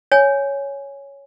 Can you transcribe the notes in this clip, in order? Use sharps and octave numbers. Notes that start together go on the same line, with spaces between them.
C#5 G#5